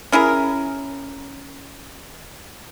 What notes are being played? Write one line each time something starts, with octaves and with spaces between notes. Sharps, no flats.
C#4 E4 G#4 A#4